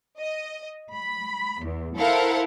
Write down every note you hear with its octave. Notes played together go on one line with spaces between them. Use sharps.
D#5
B5
E2
E4 A4 A#4 C5 F5 F#5